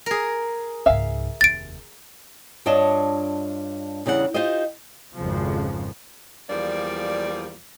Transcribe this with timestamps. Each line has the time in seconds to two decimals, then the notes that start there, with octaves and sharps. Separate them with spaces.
0.06 G#4 A#4
0.86 C#2 G#2 E5 F5 G#5
1.41 F1 D#2 A6 D7
2.66 G2 D4 F4 C#5 D#5 A5
4.06 E2 C#3 G3 A#4 F#5
4.34 D#4 F4 G4 C5 D#5
5.16 G#1 F2 C#3 F3
6.49 E2 F3 G3 A#3 D5